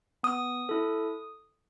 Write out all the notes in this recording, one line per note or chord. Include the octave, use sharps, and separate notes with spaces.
B3 D#6
E4 A4